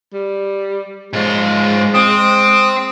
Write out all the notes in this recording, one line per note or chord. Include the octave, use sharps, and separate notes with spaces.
G3
G#2 G#3 F4
C4 D#6